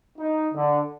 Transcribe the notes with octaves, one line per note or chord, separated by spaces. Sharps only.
D#4
D3